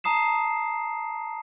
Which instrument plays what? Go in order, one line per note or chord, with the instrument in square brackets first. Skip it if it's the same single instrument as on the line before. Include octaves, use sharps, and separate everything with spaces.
[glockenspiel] A5 A#5 D#6 C7 E7